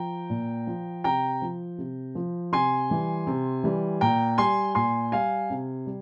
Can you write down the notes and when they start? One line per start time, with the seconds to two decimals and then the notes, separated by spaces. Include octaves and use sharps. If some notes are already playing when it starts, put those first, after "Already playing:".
Already playing: F3 G5 A#5
0.30 A#2
0.67 F3
1.04 C3 G5 A#5
1.42 F3
1.78 C3
2.15 F3
2.52 C3 G#5 C6
2.90 E3 G3
3.27 C3
3.64 E3 G3
4.01 A#2 G5 A#5
4.38 G3 G#5 C6
4.75 A#2 G#5 C6
5.12 G3 F5 G#5
5.50 C3
5.86 G3